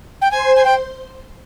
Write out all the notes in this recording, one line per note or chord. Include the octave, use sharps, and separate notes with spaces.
G5
C5 G#5 C6
G#5
G5